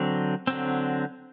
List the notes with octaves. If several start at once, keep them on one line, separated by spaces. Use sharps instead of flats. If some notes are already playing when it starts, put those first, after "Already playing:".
Already playing: D3 F#3 C4
D3 F#3 C4